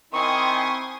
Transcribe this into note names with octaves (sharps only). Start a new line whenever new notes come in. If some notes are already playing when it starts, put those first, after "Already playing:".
D#3 C4 E4 G#5 C6 C#6 D#6